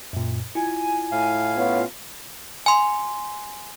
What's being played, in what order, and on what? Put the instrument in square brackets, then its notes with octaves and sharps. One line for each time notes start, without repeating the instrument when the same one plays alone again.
[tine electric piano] F#2 A#2
[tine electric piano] E4 F4 [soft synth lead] G#5
[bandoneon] A2 F5
[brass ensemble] B3 C#4 F4
[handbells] G#5 C6